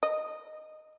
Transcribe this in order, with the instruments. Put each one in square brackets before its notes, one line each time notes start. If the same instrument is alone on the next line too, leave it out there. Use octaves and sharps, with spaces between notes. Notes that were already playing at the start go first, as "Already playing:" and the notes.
[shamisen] D#5